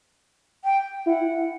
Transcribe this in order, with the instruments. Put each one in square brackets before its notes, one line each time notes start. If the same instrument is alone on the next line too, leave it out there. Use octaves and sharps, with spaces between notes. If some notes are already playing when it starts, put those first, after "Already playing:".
[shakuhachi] G5
[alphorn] E4 [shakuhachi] F#5